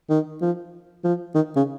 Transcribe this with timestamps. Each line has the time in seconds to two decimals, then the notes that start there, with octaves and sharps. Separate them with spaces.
0.10 D#3
0.41 F3
1.04 F3
1.35 D#3
1.56 C#3